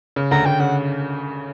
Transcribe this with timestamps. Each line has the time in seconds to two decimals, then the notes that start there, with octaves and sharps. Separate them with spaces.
0.16 C#3
0.31 D2 A#5
0.46 D2 G5
0.59 C#3 F#5